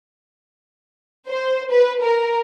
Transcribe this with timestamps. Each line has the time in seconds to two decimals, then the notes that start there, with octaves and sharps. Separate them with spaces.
1.28 C5
1.71 B4
2.02 A#4